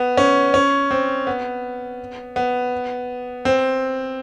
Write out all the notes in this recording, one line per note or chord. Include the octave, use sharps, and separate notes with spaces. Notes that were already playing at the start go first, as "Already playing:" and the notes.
Already playing: B3
C#4
C#4
C4
B3
B3
C4